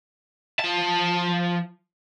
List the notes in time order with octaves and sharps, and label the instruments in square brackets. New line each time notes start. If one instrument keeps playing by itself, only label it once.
[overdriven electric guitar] F3 A5